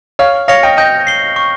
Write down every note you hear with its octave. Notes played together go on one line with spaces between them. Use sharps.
C#5 F5 F6
C#5 F5 A#6 C#7 F7
D#5 G5
D#5 G5 G6
C7 G7
C#6